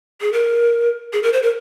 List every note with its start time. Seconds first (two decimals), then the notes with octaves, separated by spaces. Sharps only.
0.21 G#4
0.33 A#4
1.13 G#4
1.23 A#4
1.33 C5
1.43 A#4